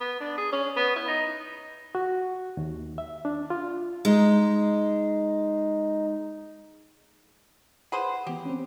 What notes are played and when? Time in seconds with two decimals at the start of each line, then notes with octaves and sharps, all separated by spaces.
0.01 B3
0.20 D4
0.38 G#4
0.52 C#4
0.76 B3
0.96 E4
1.08 D#4
1.95 F#4
2.57 D#2
2.98 E5
3.25 D4
3.50 F4
4.05 G#3 D#4
7.92 G#4 B4 C5 F#5
8.27 E3 B3 G4
8.45 C4 C#4